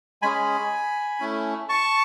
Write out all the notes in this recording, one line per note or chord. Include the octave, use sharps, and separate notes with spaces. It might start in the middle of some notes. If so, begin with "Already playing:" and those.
G#3 C#4 G#4 G#5 B5
A3 C#4 E4
A5 C#6